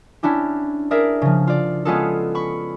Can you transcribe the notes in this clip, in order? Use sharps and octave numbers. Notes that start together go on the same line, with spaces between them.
C#4 D4 E4 G4
G#4 A#4 D5 E5
C#3 F3
F4 D5
G#3 B3 C#4 F4 G#4 A4
B5 C#6